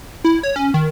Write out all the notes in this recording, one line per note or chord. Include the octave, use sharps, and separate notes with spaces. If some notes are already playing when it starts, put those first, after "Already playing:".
E4
C#5
C#4
D#3